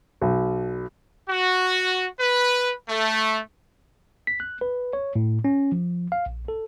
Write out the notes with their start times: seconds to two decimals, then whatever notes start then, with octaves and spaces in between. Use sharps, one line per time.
0.22 B1
1.30 F#4
2.20 B4
2.89 A3
4.27 B6
4.40 F#6
4.61 B4
4.93 C#5
5.16 A2
5.45 C#4
5.72 F3
6.12 F5
6.26 A#1
6.48 A4